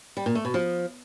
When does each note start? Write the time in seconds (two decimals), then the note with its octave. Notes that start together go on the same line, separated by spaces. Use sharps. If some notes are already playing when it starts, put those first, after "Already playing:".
0.17 G3
0.26 A#2
0.35 A3
0.45 B2
0.54 F3